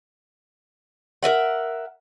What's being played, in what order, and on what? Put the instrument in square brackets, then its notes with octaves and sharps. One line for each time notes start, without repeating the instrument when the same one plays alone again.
[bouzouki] A#4 B4 E5 F#5